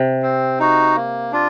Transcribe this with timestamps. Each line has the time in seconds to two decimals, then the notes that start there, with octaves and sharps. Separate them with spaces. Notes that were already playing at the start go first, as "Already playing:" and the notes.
Already playing: C3
0.22 C4
0.60 D#4 F#4
0.96 A#3
1.32 D4 F4